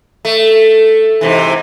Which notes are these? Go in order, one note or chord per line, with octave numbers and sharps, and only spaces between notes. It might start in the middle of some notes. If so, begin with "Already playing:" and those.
A3
G#2 C3 E3